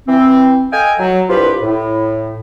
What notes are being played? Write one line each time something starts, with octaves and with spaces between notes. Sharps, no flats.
E3 C4
A4 D#5 F5 G5 G#5
F#3
C2 G2 F3 F4 G4 B4
A2